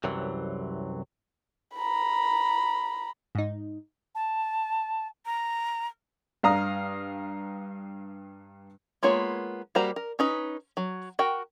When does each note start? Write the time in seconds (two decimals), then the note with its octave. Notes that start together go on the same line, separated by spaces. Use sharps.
0.04 C2 F#2 C3 E3 F#3
1.76 A#5 B5
3.35 G#2 D#4
4.15 A5
5.26 A#5
6.43 G2 F5 A#5 D#6
9.03 G#3 A#3 B3 F4 C#5
9.75 G3 A#3 F#4 C5 A#5
9.96 A#4
10.19 C#4 D#4 B4
10.77 F#3
11.19 F#4 A#4 G5